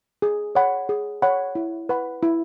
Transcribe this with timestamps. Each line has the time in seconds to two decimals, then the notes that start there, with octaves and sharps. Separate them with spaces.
0.22 G#4
0.55 C#5 F#5 B5
0.89 G#4
1.22 C#5 F#5 B5
1.55 E4
1.89 B4 F#5 B5
2.22 E4